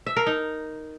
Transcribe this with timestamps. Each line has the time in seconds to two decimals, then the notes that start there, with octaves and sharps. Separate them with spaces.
0.06 E5
0.17 A#4
0.27 D#4